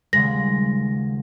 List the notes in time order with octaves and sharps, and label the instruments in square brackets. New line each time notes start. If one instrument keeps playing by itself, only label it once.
[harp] D#1 C#3 G#3 [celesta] A#6